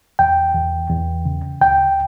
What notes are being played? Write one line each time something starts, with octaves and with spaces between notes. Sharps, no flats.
E2 G5
E2
E2
C#3
D2 G5